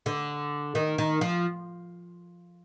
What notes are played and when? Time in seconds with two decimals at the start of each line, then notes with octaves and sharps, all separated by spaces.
0.06 D3
0.75 D#3
0.98 D#3
1.21 F3